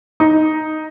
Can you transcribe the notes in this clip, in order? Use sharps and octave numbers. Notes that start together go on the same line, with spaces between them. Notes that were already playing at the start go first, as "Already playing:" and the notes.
D#4